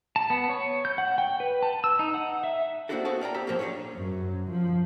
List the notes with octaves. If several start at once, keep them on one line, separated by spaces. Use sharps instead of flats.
A5
B3
C#5
G6
F#5
G5
B4
A5
E6
D#4
F#5
E5
A#3 C4 D4 E4 F#4 A4
B3 C4 F#4 G#4 A4 A5
A#4 D5 G5 A#5
C4 G4 A5 A#5
G#2 D#3 F3 F#3 A#3
C#4 D4 F4 G#4 C#5
F#2
F3